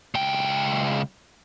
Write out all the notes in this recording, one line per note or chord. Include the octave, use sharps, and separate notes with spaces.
C#2 G5